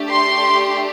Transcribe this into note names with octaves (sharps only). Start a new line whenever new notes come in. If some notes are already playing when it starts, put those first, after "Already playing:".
Already playing: A3 D4 G4
C6